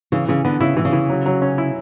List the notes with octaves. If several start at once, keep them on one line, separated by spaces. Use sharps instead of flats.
C#3 E3
C#3 E3
D3 B3
C#3 E4
B2 E3
C#3
E3
F#3
F#3
C#4
E4